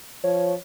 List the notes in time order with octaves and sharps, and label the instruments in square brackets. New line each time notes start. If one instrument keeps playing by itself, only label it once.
[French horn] F3 [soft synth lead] C#5